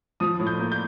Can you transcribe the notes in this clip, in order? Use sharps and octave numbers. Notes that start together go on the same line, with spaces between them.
F3 D#6
A2
G6
A#3
G6